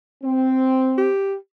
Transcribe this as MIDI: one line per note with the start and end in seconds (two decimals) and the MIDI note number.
0.23 1.10 60
0.98 1.35 67